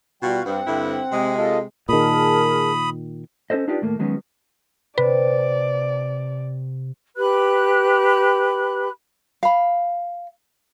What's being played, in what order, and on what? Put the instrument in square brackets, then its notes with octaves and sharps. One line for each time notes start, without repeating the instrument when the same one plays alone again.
[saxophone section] B2 F4 F#4 [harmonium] G3 G5
[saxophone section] G2 [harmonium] C4 F#5
[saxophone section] G2 D3 E4
C3 G#3
[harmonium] F4 A4 D#5
[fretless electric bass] A#2 D#3 [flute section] G#4 A#4 A5 [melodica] B5 D#6
[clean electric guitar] C#4 D#4 A4 C5 D#5
D4 D#4 F4 G4 B4 D5
D#2 A2 A3 A#3
D#3 F#3 G#3 B3 C#4
[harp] C3 [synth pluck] B4 [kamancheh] D5
[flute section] G4 B4 B5 F#6
[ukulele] F5 B5